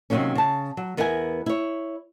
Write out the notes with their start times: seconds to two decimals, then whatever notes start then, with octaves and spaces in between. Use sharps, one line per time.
0.10 C3 D#3 E3 F#3 A#3 C#4
0.35 C#3 A5
0.77 F#3
0.97 E2 B3 A#4 E5 F#5 G#5
1.46 E4 C#5